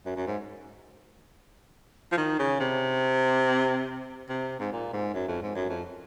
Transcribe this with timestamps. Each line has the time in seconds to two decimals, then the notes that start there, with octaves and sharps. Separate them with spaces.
0.06 F#2
0.16 F#2
0.27 G#2
2.12 F3
2.17 D#3
2.39 C#3
2.60 C3
4.29 C3
4.60 G#2
4.72 A#2
4.93 G#2
5.14 F#2
5.28 F2
5.42 G#2
5.55 F#2
5.69 F2